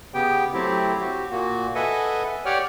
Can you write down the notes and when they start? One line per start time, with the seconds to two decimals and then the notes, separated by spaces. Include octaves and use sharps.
0.14 C#3 B3 G4 G5
0.54 F#3 A3 C4 E4 G4
1.00 F#4 G4
1.30 A#2 A#3 F#4
1.75 A4 B4 D#5 E5 F#5 G#5
2.46 G4 C#5 D5 F#5 G5 F6